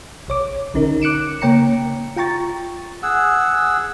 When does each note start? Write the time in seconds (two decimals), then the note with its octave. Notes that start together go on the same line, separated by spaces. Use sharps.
0.28 B1 C#5 D6
0.74 B1 D3 C#4 D#4 A#4
1.02 D6 F#6 C#7 D7 E7
1.41 C#3 A#3 C#5 G5 A#5 C#7
2.16 F4 G5 A#5 C#6 A6
3.03 G#4 F#5 E6